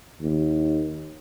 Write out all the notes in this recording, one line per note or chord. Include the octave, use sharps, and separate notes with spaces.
D#2